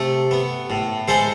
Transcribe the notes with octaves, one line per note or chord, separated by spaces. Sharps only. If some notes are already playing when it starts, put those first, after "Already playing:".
Already playing: C3 A3
B3
A2
G#3 A4 C5